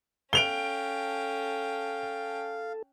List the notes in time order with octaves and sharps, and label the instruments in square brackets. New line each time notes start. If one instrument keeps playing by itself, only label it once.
[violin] C#4 G5 [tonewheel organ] A4 [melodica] F5 [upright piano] D7 F7 G7